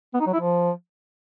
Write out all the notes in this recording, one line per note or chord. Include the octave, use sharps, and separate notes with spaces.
B3
D#4
F#3
E4
F3